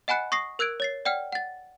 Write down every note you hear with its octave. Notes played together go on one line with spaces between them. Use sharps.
D#5 F#5 G#5 B5 F#6 C#7
C#6 D#6 A#6 C7
A#4 E6 F#6 G#6 D7
C#5 A6 C7
D5 F#5 G5 F6
F#5 A6